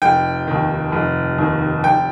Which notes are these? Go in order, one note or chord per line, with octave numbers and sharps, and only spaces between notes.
F1 G5
D#2 D#3
F1
D#2 D#3
F1 G5